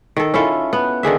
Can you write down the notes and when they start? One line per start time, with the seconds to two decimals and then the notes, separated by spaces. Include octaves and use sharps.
0.17 D#3 A4
0.34 C#4 E4 F4 A4
0.73 B3
1.03 D3 D#3 G#4 E5